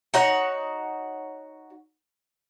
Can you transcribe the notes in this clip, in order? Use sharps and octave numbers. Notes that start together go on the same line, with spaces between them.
D#4 F#4 C#5 F#5